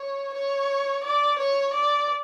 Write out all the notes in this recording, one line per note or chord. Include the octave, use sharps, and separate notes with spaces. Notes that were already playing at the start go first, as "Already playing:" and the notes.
Already playing: C#5
C#5
D5
C#5
D5